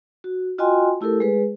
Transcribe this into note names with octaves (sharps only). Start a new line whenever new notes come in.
F#4
F4 F#4 D#5 G5 G#5 C6
A3 E4 G4 A4 A#4
G#3 G#4 B4